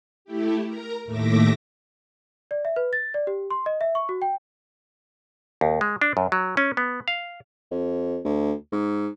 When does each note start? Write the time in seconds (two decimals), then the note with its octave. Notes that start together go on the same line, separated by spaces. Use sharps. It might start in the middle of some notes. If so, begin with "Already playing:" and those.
0.25 A3 E4 G4
0.67 A#4 A#5
1.05 D#2 A2 A3 E5 D6 A#6
2.51 D5
2.65 E5
2.76 B4
2.93 A6
3.14 D5
3.27 G4
3.50 C6
3.66 D#5
3.81 E5
3.95 C#6
4.09 F#4
4.22 G5
5.61 D#2
5.81 G#3
6.01 D4
6.17 F#2
6.32 F#3
6.57 C#4
6.77 B3
7.08 F5
7.71 F2
8.25 D2
8.72 G#2